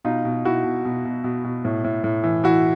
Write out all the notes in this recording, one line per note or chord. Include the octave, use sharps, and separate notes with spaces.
B2 D#4 F4
B2
B2 E4 F#4
B2
B2
B2
B2
B2
A2
A2
A2
E3
E3 E4 F#4